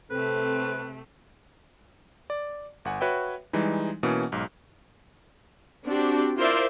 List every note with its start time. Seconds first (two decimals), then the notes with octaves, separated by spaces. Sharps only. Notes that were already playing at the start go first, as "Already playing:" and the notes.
0.11 C3 A3 C4 A4 B4
2.30 D5
2.85 G1 F#5 G#5
3.01 F#4 B4 C#5 E5 G5
3.53 E3 G3 G#3 D#4
4.03 B2 E3 A#3 B3 C#4
4.32 B1 G#2
5.84 C4 D4 F#4 G4
6.36 E4 F4 A#4 C5 D5 E5